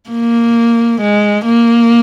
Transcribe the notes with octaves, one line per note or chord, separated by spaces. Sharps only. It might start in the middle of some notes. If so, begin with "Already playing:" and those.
A#3
G#3
A#3